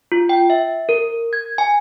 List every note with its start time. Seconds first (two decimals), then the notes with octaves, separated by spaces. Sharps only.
0.12 F4
0.29 G5
0.50 E5
0.89 A#4
1.33 G#6
1.58 G#5